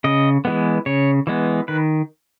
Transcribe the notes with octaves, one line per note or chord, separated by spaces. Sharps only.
C#3 D#5
E3 G#3 B3
C#3 C#5
E3 G#3 B3
D#3 B4